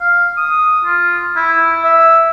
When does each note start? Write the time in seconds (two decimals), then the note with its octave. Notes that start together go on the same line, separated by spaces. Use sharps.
0.01 F5
0.37 D#6
0.85 F4
1.36 E4
1.84 E5